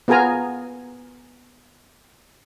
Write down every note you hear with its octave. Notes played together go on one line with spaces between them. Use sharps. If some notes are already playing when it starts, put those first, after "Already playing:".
B3 F4 G#4 A#4 G#5 A#5